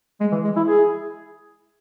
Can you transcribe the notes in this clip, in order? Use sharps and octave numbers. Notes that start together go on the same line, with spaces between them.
G#3
E3
G#3
E4
G#4